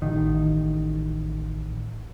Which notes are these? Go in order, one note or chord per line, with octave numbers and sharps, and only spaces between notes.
A1 D#3